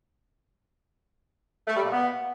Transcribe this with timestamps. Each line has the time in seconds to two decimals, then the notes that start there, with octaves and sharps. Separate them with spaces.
1.67 A3
1.75 G3
1.84 A#2
1.92 B3